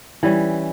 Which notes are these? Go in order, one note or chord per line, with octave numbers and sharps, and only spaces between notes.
E3 G3 C#4